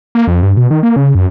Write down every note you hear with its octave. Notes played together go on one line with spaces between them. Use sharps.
A#3
F2
G2
B2
D#3
A#3
C#3
F#2